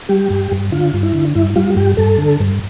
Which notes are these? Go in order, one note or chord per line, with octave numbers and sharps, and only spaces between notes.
G3 G4
G2
G2
D3 F4
G2
E4
D3
G2 E4
G3 F4
G2 G4
G2 A4
D3
G2